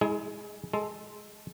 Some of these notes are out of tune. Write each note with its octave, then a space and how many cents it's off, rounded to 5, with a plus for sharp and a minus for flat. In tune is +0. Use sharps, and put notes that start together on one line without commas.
G#3 +0 E4 -35 G#4 +30
G#3 +10 A4 -5